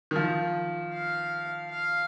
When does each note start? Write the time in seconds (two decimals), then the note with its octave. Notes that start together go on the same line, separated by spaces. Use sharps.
0.11 D#3
0.16 F3
0.94 F5
1.70 F5